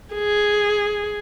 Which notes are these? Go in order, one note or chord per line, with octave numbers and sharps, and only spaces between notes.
G#4